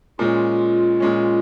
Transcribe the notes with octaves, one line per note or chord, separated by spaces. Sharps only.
A#2 G#3 C#4 F4
A#2 G#3 C#4